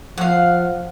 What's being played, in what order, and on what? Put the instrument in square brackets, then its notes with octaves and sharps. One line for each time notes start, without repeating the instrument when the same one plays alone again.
[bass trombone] F3 [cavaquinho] F5 F#5